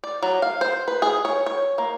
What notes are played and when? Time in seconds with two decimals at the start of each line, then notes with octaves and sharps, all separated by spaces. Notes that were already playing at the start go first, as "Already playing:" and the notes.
0.04 D5
0.23 F#3
0.42 F5
0.61 C5
0.88 B4
1.02 G#4
1.25 C#5
1.46 C#5
1.78 A#3